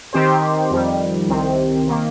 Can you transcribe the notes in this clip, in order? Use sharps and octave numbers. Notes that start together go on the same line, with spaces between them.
D#3 C4 G4 C5
F2 D#3 G3
C2 C3 D#3 C4
D#3 A#3